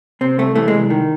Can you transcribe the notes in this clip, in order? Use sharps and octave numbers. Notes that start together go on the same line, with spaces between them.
C3 C4
C2 A3
E3 A3
G#3
C2
D#3